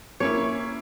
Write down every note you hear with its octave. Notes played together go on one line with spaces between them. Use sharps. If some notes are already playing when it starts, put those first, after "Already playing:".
A#3 C#4 E4 C#5